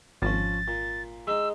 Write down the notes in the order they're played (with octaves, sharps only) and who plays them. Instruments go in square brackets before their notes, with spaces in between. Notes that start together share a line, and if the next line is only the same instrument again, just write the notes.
[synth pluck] G#1 [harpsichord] F3 C#4 [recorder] A6
[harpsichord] A#2
[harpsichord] G#3 D#4 [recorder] E6